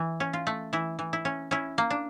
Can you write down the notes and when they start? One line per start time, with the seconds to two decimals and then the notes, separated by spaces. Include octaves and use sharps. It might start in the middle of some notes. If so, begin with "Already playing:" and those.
Already playing: E3
0.20 C#4
0.33 F4
0.47 A3
0.73 E3 E4
0.99 E3
1.13 E4
1.25 C#4
1.51 C#4 E4
1.78 A#3
1.90 D4